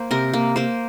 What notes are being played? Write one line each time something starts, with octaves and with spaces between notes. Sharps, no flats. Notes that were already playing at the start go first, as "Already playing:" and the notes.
Already playing: A#3 C5
C3 A#4
A#3
A#3 C5